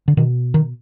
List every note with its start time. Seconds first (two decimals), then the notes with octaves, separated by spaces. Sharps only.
0.08 D3
0.17 B2 D#3
0.54 D#3